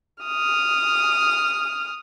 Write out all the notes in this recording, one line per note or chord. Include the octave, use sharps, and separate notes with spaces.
D#6 F6